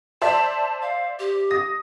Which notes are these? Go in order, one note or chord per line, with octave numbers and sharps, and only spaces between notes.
C5 D5 E5 A5
F5
G4
D#6 A#6